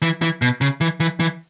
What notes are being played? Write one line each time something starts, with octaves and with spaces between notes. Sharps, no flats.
E3
E3
B2
C#3
E3
E3
E3